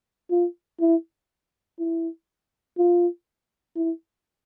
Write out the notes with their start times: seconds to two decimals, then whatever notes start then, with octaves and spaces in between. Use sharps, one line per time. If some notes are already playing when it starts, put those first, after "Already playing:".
0.31 F4
0.80 E4
1.79 E4
2.78 F4
3.76 E4